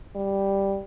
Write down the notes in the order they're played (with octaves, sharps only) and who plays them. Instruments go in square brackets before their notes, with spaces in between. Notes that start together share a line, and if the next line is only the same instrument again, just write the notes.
[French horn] G3